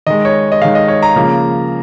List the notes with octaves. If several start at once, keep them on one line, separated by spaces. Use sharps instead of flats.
D#3 G#3 D#5
C#5
D#5
D#3 G#3 F5
D#5
C#5
A#5
C#3 F3 A#3